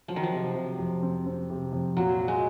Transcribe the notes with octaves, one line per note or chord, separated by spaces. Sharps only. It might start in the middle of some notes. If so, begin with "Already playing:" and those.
F3 F#3
D#3
F3
C3
C3
F2
C4
C4
C3
F2
A#2 F#3
F#4
G#3